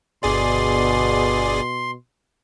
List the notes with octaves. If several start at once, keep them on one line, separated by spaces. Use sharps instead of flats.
G1 B2 G#4 D5 C6